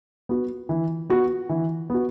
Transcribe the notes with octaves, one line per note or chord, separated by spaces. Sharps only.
B3 F#4
E3
B3 F#4
E3
B3 F#4